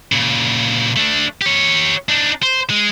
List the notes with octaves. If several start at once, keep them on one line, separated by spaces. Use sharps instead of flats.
A#2 C#3
A3 D4
G4 C#5
D4 D#4
C5
G#3